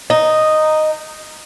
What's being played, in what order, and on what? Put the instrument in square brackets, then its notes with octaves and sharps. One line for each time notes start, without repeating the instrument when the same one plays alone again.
[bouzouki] D#4